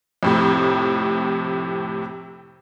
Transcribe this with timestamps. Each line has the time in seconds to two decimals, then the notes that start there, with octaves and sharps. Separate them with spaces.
0.23 F2 A2 C3